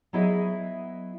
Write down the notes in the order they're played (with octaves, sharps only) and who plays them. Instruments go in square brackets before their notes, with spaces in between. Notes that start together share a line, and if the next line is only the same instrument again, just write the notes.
[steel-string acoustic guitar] F#3 B3 E4 G#4 D#5 E5